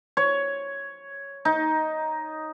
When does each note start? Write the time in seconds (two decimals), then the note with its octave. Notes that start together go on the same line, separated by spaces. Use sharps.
0.17 C#5
1.45 D#4